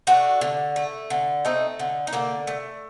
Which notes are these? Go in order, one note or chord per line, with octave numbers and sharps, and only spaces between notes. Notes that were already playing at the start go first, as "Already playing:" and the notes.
A3 D4 F#4
D3
A3
D3
A3 C4 D#4
D3
D#4
D3 A#3 D4
A3